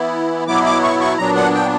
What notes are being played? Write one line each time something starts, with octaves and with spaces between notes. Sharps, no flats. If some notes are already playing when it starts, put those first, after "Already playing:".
Already playing: E3 B3 E4
B2 F#3 B3 E4 D6
D6
C#6
C#6
A#2 F#3 B3 D4 A#5
F#5
G5